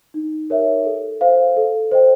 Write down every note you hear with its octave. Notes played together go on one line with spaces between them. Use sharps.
D#4
G4 A#4 C#5 E5
A4
C5 F5
A4
C5 D#5 G5